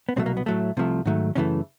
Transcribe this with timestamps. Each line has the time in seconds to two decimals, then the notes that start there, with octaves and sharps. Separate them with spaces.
0.09 B3
0.16 C2 B2 F#3 A3 C4
0.26 A#3
0.37 B3
0.46 A2 F#3 A3
0.77 C2 C3 F3 A3
1.05 G#2 D#3 F#3 A3
1.35 F#2 C#3 E3 A3 C#4